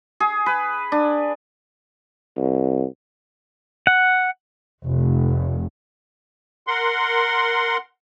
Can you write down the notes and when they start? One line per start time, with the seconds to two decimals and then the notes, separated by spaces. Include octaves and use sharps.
0.20 G#4
0.46 B4
0.92 D4
2.37 C2
3.87 F#5
4.87 F1
6.67 A#4 F#5 C6